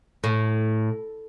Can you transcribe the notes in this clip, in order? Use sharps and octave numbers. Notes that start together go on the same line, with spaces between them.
A2